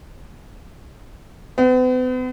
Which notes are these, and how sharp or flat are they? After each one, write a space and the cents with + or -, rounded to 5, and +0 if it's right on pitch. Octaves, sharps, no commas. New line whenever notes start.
B3 +45